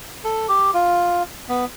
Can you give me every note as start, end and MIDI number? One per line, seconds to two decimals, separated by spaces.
0.25 0.47 69
0.49 0.71 67
0.74 1.23 65
1.49 1.65 59